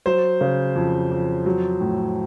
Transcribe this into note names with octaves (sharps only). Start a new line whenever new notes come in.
F#3 C5
C#3
F2
F2
F#3
A2